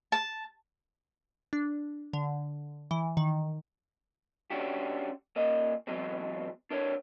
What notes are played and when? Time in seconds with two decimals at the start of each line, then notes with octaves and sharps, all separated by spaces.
0.12 A5
1.53 D4
2.13 D3
2.91 E3
3.17 D#3
4.50 C#4 D4 F#4 G4
5.36 A#2 A#4 D#5
5.87 E2 B2 F#3 G#3 C4
6.71 D4 A#4 C5 C#5